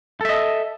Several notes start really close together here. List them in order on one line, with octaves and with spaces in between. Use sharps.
A4 E5 D#5